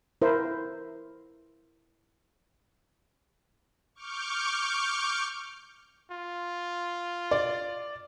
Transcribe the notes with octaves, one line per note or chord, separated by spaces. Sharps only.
E4 A#4 C5
C#6 D6 F6 G6
F4
D5